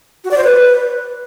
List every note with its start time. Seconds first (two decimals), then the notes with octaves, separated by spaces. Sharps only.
0.24 F#4
0.31 D5
0.37 C5
0.44 B4